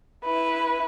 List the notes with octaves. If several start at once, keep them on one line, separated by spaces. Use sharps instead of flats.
E4 B4